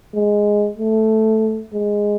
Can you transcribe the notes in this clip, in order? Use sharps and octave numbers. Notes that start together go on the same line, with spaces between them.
G#3
A3
G#3